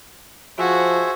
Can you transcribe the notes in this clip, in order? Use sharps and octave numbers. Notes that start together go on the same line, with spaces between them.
F3 F#4 G#4 C5 E5